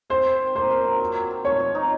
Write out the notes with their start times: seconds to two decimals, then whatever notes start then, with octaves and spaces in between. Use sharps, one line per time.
0.10 C4 C5
0.25 C4
0.40 C4
0.55 A#3 C5
0.71 F4
0.85 F#3
1.00 F#3
1.15 C4
1.31 F4
1.45 F3 C#5
1.60 F3
1.75 D#4